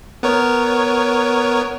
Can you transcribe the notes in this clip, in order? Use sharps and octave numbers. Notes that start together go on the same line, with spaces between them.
B3 A#4 C#5